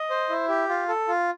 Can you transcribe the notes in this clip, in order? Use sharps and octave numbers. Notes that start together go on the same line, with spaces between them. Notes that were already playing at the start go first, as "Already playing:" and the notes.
Already playing: D#5
C5
E4
G4
F4
A4
F4